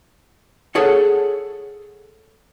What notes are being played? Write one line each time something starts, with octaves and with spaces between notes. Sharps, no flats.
G#4 A4 C#5 F#5